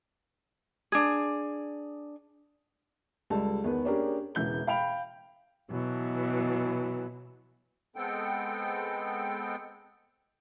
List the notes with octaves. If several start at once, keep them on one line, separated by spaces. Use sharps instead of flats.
D4 G#4
C#2 G3 A4 A5
E2 D#3 B3 B4
A#3 C#4 D4 G4 G#4 A#4
E1 C#3 E3 G6 G7
F5 G5 B5 D7 F7
B2 E3 F#3
G#3 B3 C4 A4 G5